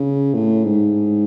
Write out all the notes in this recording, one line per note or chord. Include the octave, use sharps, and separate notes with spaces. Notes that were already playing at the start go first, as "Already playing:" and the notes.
Already playing: C#3
A2
G#2